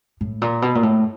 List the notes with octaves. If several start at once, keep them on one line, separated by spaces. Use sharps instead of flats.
A2
A#2
B2
A#2
A2